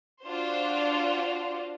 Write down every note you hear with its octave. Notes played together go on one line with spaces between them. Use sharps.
D4 F4 F#4 C5